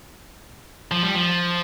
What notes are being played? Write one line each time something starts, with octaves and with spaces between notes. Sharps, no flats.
F3
G3
F3